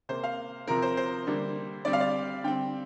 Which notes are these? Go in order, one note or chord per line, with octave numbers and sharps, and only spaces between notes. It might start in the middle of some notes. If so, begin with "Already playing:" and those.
C3 A#3 C5
F5
C3 F3 C4 A#4
C5
C5
D3 G3 A#3
D3 G3 C4 D5
F5
D5
D3 G3 C4 G5